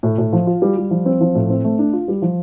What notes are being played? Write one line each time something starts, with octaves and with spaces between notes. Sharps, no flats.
A2
A2
F3
F4
G3
G3
F3
C4
F3
A2
C4
A3
D4
F4
G3
F3